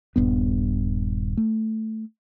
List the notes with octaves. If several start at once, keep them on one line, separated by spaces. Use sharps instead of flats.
D#1 G2 B3
A3